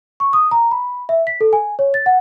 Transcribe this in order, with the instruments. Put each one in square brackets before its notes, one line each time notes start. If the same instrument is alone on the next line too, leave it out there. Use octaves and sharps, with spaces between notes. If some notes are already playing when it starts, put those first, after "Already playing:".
[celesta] C#6
D#6
A#5
B5
E5
B6
A4
G#5
C#5
A6
F#5